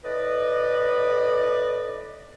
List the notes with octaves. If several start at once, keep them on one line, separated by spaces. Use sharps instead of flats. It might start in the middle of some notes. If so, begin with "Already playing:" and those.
A2 B4 D5 D#5